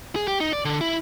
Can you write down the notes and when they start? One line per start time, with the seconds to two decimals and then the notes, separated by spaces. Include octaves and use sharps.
0.16 G#4
0.28 G4
0.40 D#4
0.53 D5
0.65 D3
0.81 E4